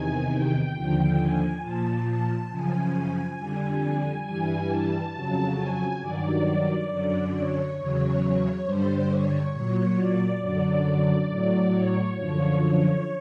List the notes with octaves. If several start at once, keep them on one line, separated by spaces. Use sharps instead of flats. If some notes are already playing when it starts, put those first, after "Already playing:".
Already playing: E2 C3 D#3 G#5
G5
D#2 D3 F3
G#5
A#2 F3 A5
A5
F#2 C#3 F3 G#5
F2 D3 G3
G2 E3 G3 G#5
A5
F2 C#3 F#3
G#5
G2 D#3 F#3 D5
F#2 D3 F#3
C#5
E2 C#3 F#3 C#5
G2 D3 G3 C5
C#5
A#2 F#3 C#5
D5
F#2 D3 F#3 D5
A2 F#3
C#5
F#2 D3 F3